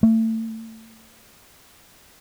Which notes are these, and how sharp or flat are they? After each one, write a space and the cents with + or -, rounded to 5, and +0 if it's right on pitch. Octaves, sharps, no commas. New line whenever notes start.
A3 +30